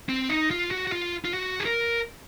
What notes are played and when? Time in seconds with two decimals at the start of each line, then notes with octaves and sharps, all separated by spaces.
0.09 C4
0.30 D#4
0.51 F4
0.71 F#4
0.87 F#4
0.92 F4
1.25 F4
1.34 F#4
1.60 G#4
1.65 A#4